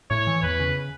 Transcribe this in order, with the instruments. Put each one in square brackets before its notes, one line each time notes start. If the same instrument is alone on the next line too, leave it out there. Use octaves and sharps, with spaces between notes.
[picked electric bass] A2 [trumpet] C#5
[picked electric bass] E3
[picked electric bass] E2 [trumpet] B4
[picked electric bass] C#3